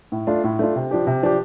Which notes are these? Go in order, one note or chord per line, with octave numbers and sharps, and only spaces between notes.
A2
A3 D4 F4
A2
A3 D4 F4
C3
F3 D4 G4
C3
F3 D4 G4